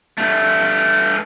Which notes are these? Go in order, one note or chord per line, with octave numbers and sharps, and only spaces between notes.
G2 A3